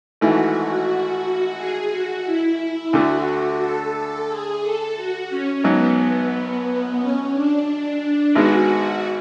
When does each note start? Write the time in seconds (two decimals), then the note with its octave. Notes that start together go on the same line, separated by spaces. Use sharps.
0.21 G#1 G#2 E3 A3 E4 F#4
1.58 G#4
1.91 F#4
2.25 E4
2.92 D2 D3 A3 F#4
3.60 A4
4.29 G#4
4.63 A4
4.96 F#4
5.30 C#4
5.64 G#1 G#2 F#3 B3
6.99 C#4
7.34 D4
8.35 G#1 G#2 G#3 B3 F#4